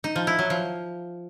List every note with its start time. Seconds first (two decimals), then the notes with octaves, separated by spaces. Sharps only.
0.04 D#4
0.16 F3
0.27 E4
0.39 F#3
0.50 F3